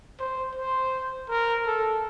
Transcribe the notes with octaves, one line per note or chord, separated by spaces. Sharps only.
C5
C5
A#4
A4